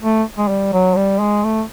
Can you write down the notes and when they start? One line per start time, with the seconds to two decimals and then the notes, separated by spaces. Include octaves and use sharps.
0.02 A3
0.38 G#3
0.48 G3
0.73 F#3
0.96 G3
1.20 G#3
1.44 A3